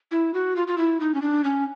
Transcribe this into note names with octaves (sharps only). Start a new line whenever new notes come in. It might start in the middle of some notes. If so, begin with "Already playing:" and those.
E4
F#4
F4
F4
E4
D#4
C#4
D4
C#4